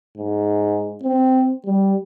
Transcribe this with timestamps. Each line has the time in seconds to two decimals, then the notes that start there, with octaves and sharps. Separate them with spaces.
0.17 G#2
1.03 C4
1.65 G3